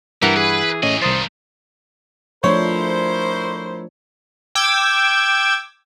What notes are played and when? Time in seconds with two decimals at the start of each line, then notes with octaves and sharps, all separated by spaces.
0.22 G2 E3 G3 A#4 F#5
0.37 G#4 B4
0.83 F#2 A2 C#4 G#4 D#5
1.02 C2 G2 D#3 C5 D#6 A6
2.44 F3 A3 D4 E4 A#4 C5 C#5
4.55 G5 D6 E6 G#6